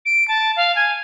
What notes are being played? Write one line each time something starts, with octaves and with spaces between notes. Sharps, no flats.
D7
A5
F5
G#5